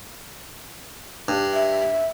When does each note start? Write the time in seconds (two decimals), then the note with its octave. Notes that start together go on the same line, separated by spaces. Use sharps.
1.28 G2
1.54 E5